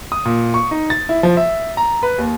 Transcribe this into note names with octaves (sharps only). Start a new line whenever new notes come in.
D#6
A#2
C#6
D#4
A6
E4
F3
E5
A#5
B4
D#2